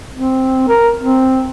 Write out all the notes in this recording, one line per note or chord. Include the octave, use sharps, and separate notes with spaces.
C4
A#4
C4